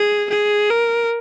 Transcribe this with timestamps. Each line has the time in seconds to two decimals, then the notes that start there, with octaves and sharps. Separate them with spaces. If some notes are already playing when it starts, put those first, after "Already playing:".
Already playing: G#4
0.29 G#4
0.70 A#4